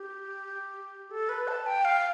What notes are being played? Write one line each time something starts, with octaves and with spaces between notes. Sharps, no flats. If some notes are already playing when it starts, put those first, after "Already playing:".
Already playing: G4
A4
B4
A5
G5
F5